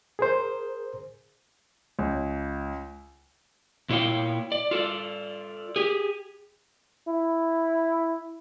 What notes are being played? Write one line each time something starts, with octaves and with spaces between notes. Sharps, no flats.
G#4 A#4 C5
C#2
A#2 E4 C#5 F5 G5
D5
F4 A4 D5
G4 G#4
E4